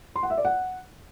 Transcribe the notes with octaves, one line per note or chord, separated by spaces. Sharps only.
C6
F#5
E5
D5
F#5